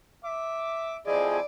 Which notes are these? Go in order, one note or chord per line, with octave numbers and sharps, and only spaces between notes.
E5 D6
F2 F3 E4 G#4 D5 D#5 G#5